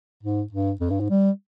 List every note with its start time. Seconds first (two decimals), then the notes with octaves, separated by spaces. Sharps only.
0.23 G#2
0.52 G2
0.81 F2
0.90 G2
1.00 G#2
1.10 G3